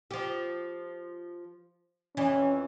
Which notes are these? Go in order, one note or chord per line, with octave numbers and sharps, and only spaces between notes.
F3 G4
F2 E3 C#4